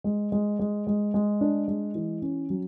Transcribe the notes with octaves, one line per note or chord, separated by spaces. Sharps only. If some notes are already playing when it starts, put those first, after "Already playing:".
G#3
G#3
G#3
G#3
G#3
D4
G#3
E3
C#4
F#3